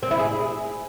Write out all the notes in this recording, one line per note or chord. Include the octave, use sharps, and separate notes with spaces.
C4
E4
G#4